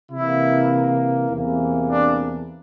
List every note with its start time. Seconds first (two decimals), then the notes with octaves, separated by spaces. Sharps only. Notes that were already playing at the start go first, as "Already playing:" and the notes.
0.10 C3 E3 A#3 E4
1.30 E2 C3 E3 A#3
1.89 D4